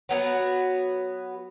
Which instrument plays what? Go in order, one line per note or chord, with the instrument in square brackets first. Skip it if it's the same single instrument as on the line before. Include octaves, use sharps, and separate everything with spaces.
[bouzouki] F#3 B3 D#4 F#4